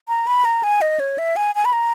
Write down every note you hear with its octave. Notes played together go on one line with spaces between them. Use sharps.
A#5
B5
A#5
G#5
D#5
C#5
E5
G#5
G#5
B5
A#5